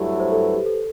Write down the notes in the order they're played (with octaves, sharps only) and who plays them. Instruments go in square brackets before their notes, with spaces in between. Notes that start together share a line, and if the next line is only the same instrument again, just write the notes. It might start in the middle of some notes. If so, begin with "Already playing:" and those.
Already playing: [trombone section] G2 F#3 A3 E4 [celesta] G4
[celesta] C5
A4
B4
G4
A4